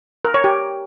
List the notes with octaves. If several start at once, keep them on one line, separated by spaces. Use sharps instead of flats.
A#4
C#5
G4